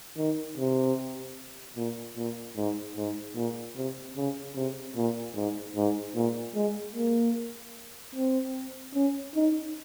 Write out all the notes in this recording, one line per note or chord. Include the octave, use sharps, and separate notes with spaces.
D#3
C3
A#2
A#2
G#2
G#2
A#2
C3
C#3
C3
A#2
G#2
G#2
A#2
G#3
A#3
C4
C#4
D#4